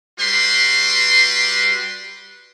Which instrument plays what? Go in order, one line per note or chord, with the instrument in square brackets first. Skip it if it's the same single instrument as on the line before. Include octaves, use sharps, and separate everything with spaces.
[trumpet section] G3 F#4 G4 B4 C6